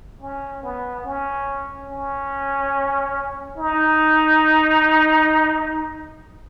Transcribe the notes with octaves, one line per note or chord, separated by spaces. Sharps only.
C#4
B3
C#4
C#4
D#4